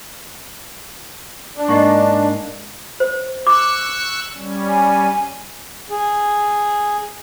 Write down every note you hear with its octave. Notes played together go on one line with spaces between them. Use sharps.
D4
G#2 A#3 D#5 C#6
C5
C#6 D6 E6 F#6
G3 C#4
G#5
G#4